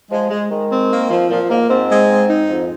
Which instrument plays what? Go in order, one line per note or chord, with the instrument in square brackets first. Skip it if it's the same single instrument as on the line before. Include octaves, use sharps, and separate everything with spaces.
[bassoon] F3 [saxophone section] G#3
[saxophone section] G#3
[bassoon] D#3 [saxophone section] G#3
[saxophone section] C4
A#3
F3
[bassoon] A#2 [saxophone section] F3
[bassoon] G#2 [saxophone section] A#3
[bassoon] G#2 [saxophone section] C4
[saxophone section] G#3
C4
D#4
[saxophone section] F2 [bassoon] G#2